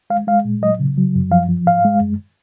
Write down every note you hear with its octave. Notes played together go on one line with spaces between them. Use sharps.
G#3 F5
G#3 F5
A#2
F#3 D#5
C#3
F#3
F#2
F3 F5
F3
G#2 F5
G#3
F#2